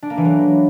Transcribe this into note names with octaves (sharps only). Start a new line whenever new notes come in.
D4
A#3
E3
F#3